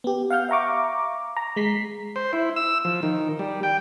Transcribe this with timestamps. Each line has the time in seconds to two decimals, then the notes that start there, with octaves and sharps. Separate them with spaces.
0.04 B3 G4
0.30 F5 F#5 F6 G6
0.49 E5 F5 A#5 C#6 D6
1.37 A#5
1.56 G#3 B6 C7
2.16 C5
2.33 E4
2.56 E6
2.85 F3
3.03 D#3
3.39 G3
3.63 G5